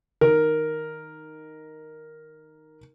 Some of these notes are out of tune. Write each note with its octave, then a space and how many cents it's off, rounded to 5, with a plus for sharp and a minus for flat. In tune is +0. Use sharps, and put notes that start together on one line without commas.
D#3 +0 A#4 +0